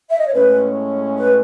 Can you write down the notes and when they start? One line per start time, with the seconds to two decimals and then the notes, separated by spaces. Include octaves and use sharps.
0.10 E5
0.19 D#5
0.26 C#5
0.33 A2 G#3 C#4 B4
1.18 B4